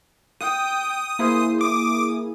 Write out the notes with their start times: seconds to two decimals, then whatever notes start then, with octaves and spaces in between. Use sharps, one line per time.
0.41 G5 D#6
1.19 A#3 E4 G#4 C5
1.61 D6 D#6